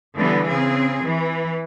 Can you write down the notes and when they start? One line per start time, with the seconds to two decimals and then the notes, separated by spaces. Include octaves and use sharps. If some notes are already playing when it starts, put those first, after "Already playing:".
0.16 D3 E3 G3 B3
0.46 C#3 C4 G#4
1.03 E3